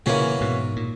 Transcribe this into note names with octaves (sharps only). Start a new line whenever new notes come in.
A#2 C#3 E3 A#3 C#4 F#4
G#2 B2
A#2